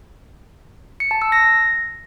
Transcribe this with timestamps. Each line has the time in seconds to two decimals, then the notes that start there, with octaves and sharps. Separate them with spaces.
1.00 C#7
1.11 A5
1.22 E6
1.32 A#6